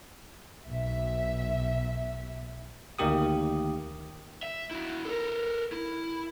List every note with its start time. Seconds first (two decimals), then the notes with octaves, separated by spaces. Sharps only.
0.67 B1 E5
2.99 D2 D#3 A#3 G4 D#6
4.43 E5
4.71 E4 F#4
5.05 A4 A#4
5.72 E4